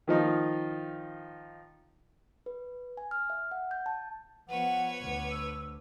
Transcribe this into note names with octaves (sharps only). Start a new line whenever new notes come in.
D#3 F3 D#4 F4
B4
G#5
F6
E5
F#5
G6
A5
F3 B3 B4 C#5 F#5
D2 F#5
E6